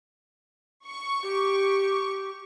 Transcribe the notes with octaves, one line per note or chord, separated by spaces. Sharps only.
C#6
G4